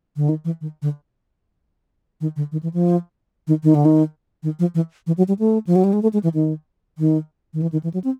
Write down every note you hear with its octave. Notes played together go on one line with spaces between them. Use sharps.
D3
D#3
E3
D#3
D3
D#3
D3
D#3
E3
F3
D#3
D#3
D3
D#3
D#3
F3
E3
E3
F#3
G3
A3
F3
F#3
G3
G#3
A3
G#3
E3
D#3
D#3
D#3
E3
D#3
E3
F#3
C4